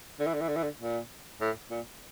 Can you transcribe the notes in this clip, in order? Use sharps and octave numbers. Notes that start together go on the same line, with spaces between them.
D3
E3
D3
E3
D3
E3
D3
A#2
A2
A#2